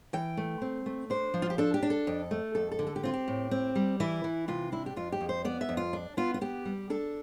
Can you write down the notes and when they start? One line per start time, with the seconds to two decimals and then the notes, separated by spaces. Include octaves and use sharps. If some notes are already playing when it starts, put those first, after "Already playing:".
0.13 E3 G5
0.37 A3
0.62 C4
0.86 A3
1.10 D4 C5
1.34 F3
1.42 F4
1.50 G4
1.58 D4 A4
1.74 G4
1.83 D4
1.90 A4
2.07 F2
2.31 A3
2.55 F2 A4
2.71 A4
2.79 D3
2.87 A4
2.96 G4
3.03 C4 F4
3.14 G4
3.28 A2
3.51 C4
3.75 G3
4.00 E3 E4
4.24 E3
4.48 C3 F4
4.72 D4 E4
4.86 G4
4.96 F2 F4
5.12 G4
5.20 F2
5.29 C5
5.45 B3 D5
5.61 E5
5.69 F2
5.77 F4
5.93 D4
6.17 B3 F4
6.34 F4
6.41 B3 G4
6.65 G3
6.90 D4 A4